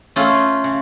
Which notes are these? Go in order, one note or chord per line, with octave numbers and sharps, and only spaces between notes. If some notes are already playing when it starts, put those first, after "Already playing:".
A3 C#4 F4
C#3